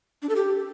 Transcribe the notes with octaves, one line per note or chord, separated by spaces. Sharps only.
D4
A4
G4